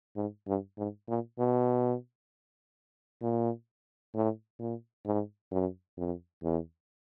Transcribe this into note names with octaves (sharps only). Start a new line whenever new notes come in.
G#2
G2
G#2
A#2
B2
A#2
A2
A#2
G#2
F#2
F2
E2